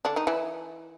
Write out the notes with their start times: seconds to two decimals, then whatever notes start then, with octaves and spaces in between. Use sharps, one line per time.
0.05 D3 D4
0.16 D#3 D#4
0.27 E3 E4